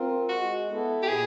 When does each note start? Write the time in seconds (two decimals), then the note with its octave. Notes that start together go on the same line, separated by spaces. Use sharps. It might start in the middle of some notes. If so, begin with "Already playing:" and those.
Already playing: C4 F4 A#4
0.29 G#3 F#4
0.68 B3 E4 A4
1.03 G4
1.08 A#2 G#4